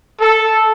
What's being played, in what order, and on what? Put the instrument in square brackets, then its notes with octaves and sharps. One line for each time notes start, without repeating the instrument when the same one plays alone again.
[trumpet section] A4